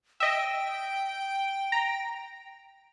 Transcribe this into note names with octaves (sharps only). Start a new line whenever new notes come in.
D#5 E5 G5
A#5